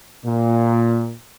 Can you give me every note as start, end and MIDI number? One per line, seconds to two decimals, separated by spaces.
0.25 1.13 46